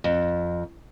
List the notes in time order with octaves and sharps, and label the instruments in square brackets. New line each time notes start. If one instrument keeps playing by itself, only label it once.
[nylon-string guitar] F2